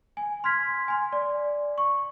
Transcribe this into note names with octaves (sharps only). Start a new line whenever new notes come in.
G#5
C6 F6 G#6 B6
G#5 C6
D5
C#6